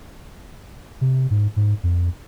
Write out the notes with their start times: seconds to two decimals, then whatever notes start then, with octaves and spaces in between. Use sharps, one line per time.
1.01 C3
1.31 G#2
1.56 G#2
1.83 F2